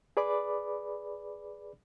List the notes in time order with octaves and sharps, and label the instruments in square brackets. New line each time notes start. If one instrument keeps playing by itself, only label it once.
[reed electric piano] G#4 B4 D5 B5 D6